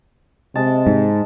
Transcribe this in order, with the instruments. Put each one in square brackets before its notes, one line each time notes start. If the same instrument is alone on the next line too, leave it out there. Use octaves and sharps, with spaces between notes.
[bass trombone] C3 [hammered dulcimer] G#3 A5
[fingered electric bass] G#2